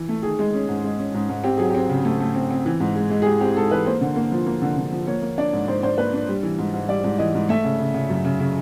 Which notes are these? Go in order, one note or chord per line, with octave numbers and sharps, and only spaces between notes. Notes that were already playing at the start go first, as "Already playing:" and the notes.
Already playing: E3
A3
D#3 G#4
G#3
C#4
G#2
G#3
C#4
G#2
G#2
C4 G4
F#3 G#4
C4 G4
C#3
A3
A3
C4
C4
E3
G#2
G#3
G#3
G#4
G#3 G4
C4 G4
G#2 A4
E3 B4
A#3 C5
D3
A#3
F3
A#3
D3
D3
F3
A#3 C#5
A#3
D4 D5
G#2
G#2 C5
D4 C5
A#3 B4
D4
G3
E3
G#2
G#2
G3 D5
G#2
E3 D#5
G#2
A3 E5
C#3
C#3
C#3
F#2
C#3
C#3